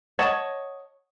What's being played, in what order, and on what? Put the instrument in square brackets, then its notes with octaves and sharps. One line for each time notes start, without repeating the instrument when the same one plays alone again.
[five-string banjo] C#5 D#5 F#5 A5